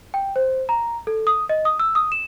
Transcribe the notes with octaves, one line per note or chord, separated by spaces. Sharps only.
G5
C5
A#5
A4
D#6
D#5
D#6
E6
D#6
E7